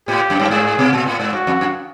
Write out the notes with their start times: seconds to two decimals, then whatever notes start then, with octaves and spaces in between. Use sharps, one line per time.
0.08 A2 G4
0.30 F#2
0.40 G2
0.50 G#2 G#4
0.78 B2
0.93 A#2
1.06 A2
1.20 G#2
1.33 G2 F#4
1.47 F2
1.61 F#2